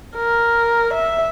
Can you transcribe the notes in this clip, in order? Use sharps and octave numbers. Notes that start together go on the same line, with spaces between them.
A#4
E5